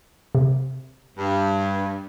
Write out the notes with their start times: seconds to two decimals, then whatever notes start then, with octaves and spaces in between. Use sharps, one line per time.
0.35 C3
1.17 G2